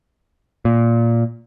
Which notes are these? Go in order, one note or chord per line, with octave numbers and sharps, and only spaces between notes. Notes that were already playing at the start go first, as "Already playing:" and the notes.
A#2